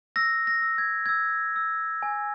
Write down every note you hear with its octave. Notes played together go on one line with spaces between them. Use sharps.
E6 A#6
A#6
E6
G#6
E6 G#6
E6
G#5